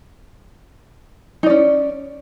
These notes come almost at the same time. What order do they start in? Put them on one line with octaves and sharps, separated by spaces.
D#4 D5 C#4